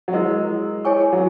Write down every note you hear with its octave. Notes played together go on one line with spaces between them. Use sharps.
F#3
G#3 E4 A#4 D#5
E4 G#4 C#5 G#5 C#6
F#3